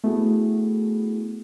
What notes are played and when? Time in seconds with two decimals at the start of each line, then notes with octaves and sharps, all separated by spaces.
0.04 A3 B3 E4 F#4 G#4